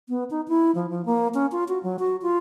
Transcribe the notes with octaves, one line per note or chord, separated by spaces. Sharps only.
B3
D#4
E4
F3
F3
A#3
C#4
F4
F#4
F#3
F#4
F4